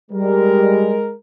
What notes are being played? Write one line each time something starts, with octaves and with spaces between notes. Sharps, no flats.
G3 G#3 A#4